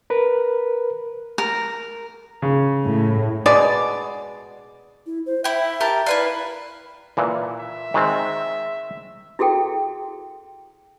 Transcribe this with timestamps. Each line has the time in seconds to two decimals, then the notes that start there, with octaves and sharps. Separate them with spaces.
0.10 A#4 B4
1.38 A#4
2.42 C#3
2.83 A2
3.46 B2 G#3 D5
5.06 E4
5.26 C5
5.44 E4 E5 G5
5.81 G4 A#4 A5
6.06 E4 B4 D5 F5
7.17 A#2 E3
7.59 E5
7.94 D#3 G#3 C4
9.39 E4 F#4 G#4 A4 G5